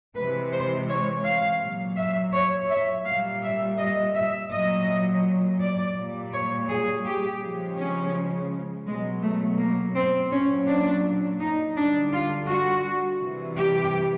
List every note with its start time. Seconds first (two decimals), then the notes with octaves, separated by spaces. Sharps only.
0.16 C3 E3 G#3 B4
0.53 C5
0.89 C#5
1.25 F5
1.62 A#2 F#3
1.97 E5
2.33 C#5
2.70 E5
3.06 A#2 G3 F5
3.43 E5
3.79 D#5
4.15 E5
4.52 A#2 F#3 D#5
5.60 D5
5.96 A#2 G3
6.33 C#5
6.69 G#4
7.06 G4
7.42 C#3 F3 G#3
7.78 C#4
8.86 B2 F#3 G#3
9.22 A3
9.58 A#3
9.96 C4
10.32 A#2 F#3 C#4
10.68 D4
11.41 D#4
11.76 D3 G3 D4
12.13 F4
12.49 F#4
13.21 C3 E3 G3
13.57 G4